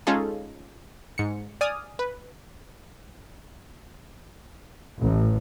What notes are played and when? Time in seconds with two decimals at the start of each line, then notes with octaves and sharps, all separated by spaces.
0.07 G#3 C#4 D#4 F4 G#4 A4
1.18 G#2 C#7
1.61 D5 G#5 D#6 F6
1.99 B4
4.99 A1